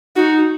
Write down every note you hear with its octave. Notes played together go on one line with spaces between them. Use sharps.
D#4 F#4